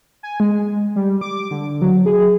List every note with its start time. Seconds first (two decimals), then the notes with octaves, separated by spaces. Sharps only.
0.23 G#5
0.40 G#3
0.96 G3
1.21 D6
1.51 D3
1.82 F#3
2.06 G#4